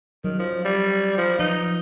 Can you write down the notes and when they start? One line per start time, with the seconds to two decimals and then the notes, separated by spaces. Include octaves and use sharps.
0.24 D#3 F#3
0.39 F3
0.65 G3
1.17 F3
1.39 F3 D#4 B4